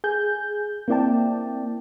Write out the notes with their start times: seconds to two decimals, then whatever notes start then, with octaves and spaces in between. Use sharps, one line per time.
0.04 G#4 G#5 G6
0.88 A#3 C4 E4 D5 G5 A5